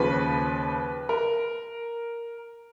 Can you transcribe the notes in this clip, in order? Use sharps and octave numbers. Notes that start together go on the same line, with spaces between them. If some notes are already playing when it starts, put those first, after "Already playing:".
Already playing: D#2 C#3 F3 B4
A#4